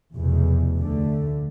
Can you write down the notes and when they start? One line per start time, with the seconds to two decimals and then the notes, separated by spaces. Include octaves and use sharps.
0.15 F1 E2 B2
0.79 D2 D3 A3